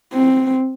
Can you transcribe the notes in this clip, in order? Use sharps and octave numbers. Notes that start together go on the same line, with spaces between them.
C4